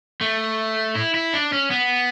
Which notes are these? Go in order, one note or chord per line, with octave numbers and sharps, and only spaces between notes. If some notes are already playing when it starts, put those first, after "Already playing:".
A3
E4
E4
D4
C#4
B3